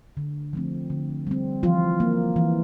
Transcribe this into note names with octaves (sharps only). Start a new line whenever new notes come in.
D3
F3 A3 C4
D3
G3 C4
E3 F3 F4
A#3
E3